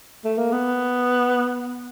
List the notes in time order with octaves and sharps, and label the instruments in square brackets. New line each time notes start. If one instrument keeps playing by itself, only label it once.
[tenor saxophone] A3
A#3
B3